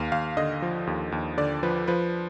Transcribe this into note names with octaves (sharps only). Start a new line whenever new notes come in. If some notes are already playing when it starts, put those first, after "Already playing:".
Already playing: D#2 F5
D#2 F5
D3 D#5
F3
D#2
D#2
D3 D5
F3 B4
F3 B4